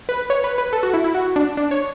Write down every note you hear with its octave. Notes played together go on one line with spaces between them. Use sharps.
B4
C#5
B4
B4
A4
F#4
E4
E4
F#4
D4
D4
C#5